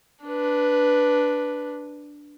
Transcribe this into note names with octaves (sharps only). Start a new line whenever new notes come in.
D4 B4